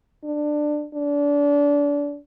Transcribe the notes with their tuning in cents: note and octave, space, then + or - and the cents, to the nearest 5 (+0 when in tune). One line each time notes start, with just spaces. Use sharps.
D4 +15
D4 -30